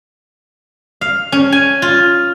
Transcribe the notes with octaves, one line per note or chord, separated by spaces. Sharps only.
F5
C#4
G#5
F4